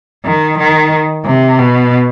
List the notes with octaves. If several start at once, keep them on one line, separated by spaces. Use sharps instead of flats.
D#3
D#3
C3
B2